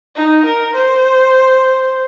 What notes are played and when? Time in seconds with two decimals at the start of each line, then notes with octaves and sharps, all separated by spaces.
0.16 D#4
0.45 A#4
0.76 C5